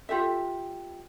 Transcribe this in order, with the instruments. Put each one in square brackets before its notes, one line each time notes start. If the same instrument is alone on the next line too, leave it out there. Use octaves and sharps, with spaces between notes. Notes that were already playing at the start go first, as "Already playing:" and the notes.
[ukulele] F4 G4 A4 E5